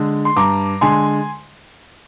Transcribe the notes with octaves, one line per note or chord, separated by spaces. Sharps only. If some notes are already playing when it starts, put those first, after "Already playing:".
Already playing: D3 G#3
C6
G2 A#5 D6
D3 G#3 G#5 C6